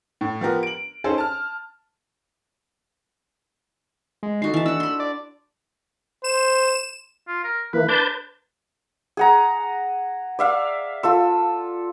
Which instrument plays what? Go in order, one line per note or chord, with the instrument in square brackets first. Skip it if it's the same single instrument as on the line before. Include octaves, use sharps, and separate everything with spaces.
[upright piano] A2
F3 B3 G4 A#4
D7 F#7
C#4 D#4 G#4 A4 C5
A5 F6
[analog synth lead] G#3
[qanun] D#4 F#4 A4 [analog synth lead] C7
[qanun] E3 A5
[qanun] D4 F#5 [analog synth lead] E6
[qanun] B5 C6
[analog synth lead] D5
[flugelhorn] C5 [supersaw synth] E7
[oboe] F4
A#4
[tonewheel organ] E3 A#3 [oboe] B4
[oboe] D4 [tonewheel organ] B4 A5 G6
[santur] G#4 F#5 A#5
D5 E5 F5
F4 A4 E6